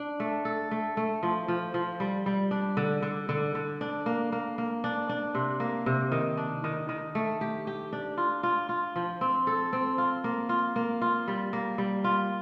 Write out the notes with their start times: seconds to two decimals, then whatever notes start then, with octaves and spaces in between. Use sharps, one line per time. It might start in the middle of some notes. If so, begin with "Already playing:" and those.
Already playing: D4
0.20 A3
0.45 A4
0.71 A3
0.97 A3
1.23 F3
1.48 F3
1.74 F3
2.00 G3
2.26 G3
2.51 D4
2.77 D3
3.02 D3
3.29 D3
3.55 D3
3.81 D4
4.06 A#3
4.32 A#3
4.58 A#3
4.84 D4
5.09 D4
5.35 C3
5.60 A#3
5.86 C3
6.12 D#3
6.37 D4
6.64 D#3
6.89 D#3
7.15 A3
7.41 G4
7.67 G4
7.93 D4
8.17 F4
8.43 F4
8.69 F4
8.96 F3
9.21 C4
9.47 A4
9.73 C4
9.98 F4
10.24 A#3
10.49 F4
10.76 A#3
11.01 F4
11.28 G3
11.53 A#3
11.78 G3
12.04 F4